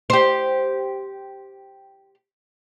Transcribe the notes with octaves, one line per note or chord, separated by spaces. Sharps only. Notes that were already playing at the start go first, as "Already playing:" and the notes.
G4 C5